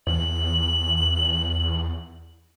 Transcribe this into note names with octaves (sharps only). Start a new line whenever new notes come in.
E2 F#7